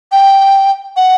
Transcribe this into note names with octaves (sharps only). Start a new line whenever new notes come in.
G5
F#5